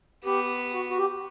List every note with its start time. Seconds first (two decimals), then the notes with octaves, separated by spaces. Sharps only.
0.24 B3 G4
0.74 F#4
0.90 F#4
0.98 G4